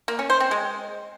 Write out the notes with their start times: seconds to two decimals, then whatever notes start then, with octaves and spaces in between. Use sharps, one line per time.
0.08 A#3
0.19 C#4
0.30 C5
0.40 C4
0.51 G#3